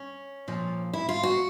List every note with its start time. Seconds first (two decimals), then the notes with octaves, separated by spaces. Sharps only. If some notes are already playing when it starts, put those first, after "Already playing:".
Already playing: C#4
0.48 A#2 F3
0.93 E4
1.09 F4
1.23 F#4